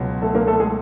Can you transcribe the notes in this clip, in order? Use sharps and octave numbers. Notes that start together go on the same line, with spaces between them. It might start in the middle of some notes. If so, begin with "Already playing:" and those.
Already playing: C#2 B2 F#3
A3 A4
A#3 A#4
A3 A4
G#3 G#4